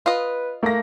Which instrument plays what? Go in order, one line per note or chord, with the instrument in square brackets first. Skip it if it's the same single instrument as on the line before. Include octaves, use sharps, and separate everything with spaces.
[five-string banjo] F4 D#5 [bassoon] B4
[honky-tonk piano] A3 A#6 [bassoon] A#3